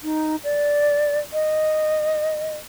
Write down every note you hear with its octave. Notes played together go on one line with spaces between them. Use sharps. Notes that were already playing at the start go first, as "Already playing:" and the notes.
D#4
D5
D#5